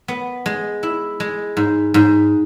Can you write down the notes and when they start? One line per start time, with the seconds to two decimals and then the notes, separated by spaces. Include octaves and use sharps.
0.08 B3
0.46 G#3
0.83 E4
1.20 G#3
1.57 G#2
1.94 G#2